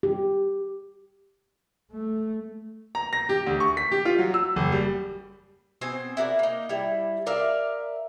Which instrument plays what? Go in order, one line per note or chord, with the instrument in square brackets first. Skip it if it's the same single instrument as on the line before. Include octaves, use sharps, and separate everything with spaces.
[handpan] G4
[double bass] A3
[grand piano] A#5
A#6
G4
D2
C#6
B6
G4
F4
F#3
E6
F#1
G3
[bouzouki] B2 C4 C5 G#5
E4 F#4 A#4 D5
A#3 D#4
G3 E4
A#4 D5 E5 F5